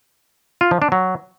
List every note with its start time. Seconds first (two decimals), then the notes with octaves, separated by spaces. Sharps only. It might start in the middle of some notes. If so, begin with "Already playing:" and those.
0.61 F4
0.71 F3
0.82 D4
0.92 F#3